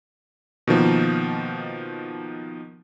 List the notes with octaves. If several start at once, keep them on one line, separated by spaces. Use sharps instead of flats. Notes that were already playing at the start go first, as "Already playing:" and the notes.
B2 D#3 F3 A#3